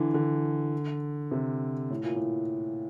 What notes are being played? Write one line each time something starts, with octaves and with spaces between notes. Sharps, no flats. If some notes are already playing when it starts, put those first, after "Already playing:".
Already playing: D3 E3
D3
C3
A2
A#2
A2